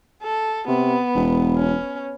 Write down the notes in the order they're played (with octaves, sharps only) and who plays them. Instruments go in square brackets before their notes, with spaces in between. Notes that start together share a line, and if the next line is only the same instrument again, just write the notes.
[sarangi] A4
[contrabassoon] C3 [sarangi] B3
[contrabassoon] E1
[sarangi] C#4